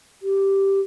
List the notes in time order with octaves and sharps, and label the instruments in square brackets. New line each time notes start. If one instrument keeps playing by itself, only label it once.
[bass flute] G4